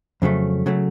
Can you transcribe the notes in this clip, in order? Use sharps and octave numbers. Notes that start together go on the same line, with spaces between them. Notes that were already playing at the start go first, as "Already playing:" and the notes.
F2 C#3 F#3 A3
C#3 F#3 A3